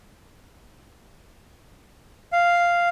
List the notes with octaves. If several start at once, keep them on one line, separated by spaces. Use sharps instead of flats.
F5